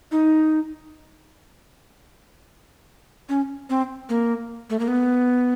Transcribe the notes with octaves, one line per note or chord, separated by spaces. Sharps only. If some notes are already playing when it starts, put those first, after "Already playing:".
D#4
C#4
C4
A#3
A3
A#3
B3